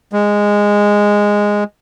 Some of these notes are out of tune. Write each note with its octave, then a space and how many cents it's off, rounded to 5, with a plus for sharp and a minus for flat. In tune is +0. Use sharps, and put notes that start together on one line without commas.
G#3 -10